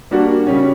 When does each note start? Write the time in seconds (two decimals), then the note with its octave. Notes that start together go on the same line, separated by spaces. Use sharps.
0.11 G3 A#3 D4 F#4
0.47 C#3 G3 C#4